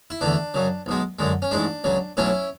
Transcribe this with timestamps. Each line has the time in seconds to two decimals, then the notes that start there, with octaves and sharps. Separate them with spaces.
0.10 E4
0.21 E2 D3 A3 D4
0.54 F#2 C#3 F#3
0.86 B1 B2 G#3
1.19 F#2 D3 G#3
1.42 C#4
1.51 A1 G#2 G#3 D4
1.84 C#2 C#3 F#3
2.17 B1 A2 F#3 C#4 E4